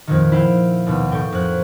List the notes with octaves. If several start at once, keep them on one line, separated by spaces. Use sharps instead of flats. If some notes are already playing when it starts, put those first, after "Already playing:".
F2 A#2 D#3
E4 F5 G5
D#2 B2
A2 G5 C#6
F2 F#6